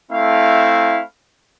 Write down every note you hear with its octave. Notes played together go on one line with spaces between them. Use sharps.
A3 C4 E4 F5